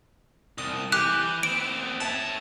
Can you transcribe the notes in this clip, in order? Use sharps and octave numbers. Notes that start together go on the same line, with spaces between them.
C2 D#6
E3 G4 F#6
B3 C4 D7
C#5 E5 A5